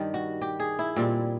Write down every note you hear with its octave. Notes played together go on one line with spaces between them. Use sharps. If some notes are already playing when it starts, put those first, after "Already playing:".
Already playing: G2 D#3 G3
F#4
G4
G#4
E4
A#2 G3 C4